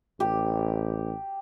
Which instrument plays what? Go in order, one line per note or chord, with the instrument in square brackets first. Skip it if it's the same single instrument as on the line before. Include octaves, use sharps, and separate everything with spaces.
[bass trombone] A1 [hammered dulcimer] G4